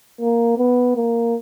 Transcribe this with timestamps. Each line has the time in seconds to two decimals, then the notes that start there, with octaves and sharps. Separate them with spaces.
0.21 A#3
0.58 B3
0.96 A#3